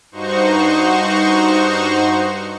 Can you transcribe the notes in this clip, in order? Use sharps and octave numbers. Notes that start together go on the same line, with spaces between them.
G2 D#4 F#4 C5 C#6